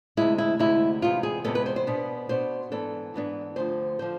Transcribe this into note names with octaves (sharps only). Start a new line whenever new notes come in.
D2 C3 G#3 E4
E4
D2 C3 G#3 E4
E2 C3 G#3 B3 F4
G#4
E2 C3 G#3 B3 A4
B4
C5
C5
B2 B3 D4
B2 B3 D4 C5
G#2 E3 B3 D4 A4
G#2 E3 B3 D4
D2 D3 F3 C5
D3 F3 C5